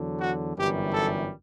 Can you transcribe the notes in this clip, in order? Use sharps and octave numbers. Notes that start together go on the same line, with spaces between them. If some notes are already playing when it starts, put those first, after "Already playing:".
Already playing: E2 D3 F#3
F#4
G1 F#2 E3 G3 G4
A4